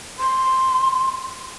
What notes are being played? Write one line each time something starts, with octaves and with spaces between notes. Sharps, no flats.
C6